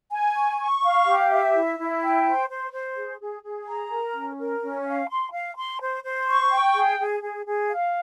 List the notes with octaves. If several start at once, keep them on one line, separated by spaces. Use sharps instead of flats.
G#5
C#6
C#6
F5
G4
E5
E4
E4
G5
C5
C5
C5
G#4
G#4
G#4
A#5
A#4
C#4
A#4
C#4
F5
C6
F5
C6
C5
C5
C#6
G5
G#4
G#4
G#4
G#4
F5